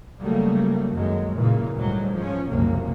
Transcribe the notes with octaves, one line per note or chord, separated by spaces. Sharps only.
C#3 F#3 G3 A3 A#3
F#2 D#3 F#3 G#3
A#2 C#3 E3
D2 G#2 F#3 G3
F3 C#4
F#1 C2 C3 A#3